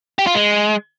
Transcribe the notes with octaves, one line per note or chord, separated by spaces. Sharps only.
G4
F4
G#3